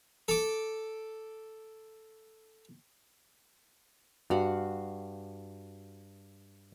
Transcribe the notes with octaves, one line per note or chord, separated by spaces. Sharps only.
A4 D6
G2 F#4 F5 F#5